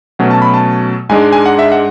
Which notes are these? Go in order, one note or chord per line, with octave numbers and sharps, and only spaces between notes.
B2 F#3 A3 C#4 F#5
A5
B5
A5
G#2 G#3 D4 G#5
G#5
F#5
E5
F#5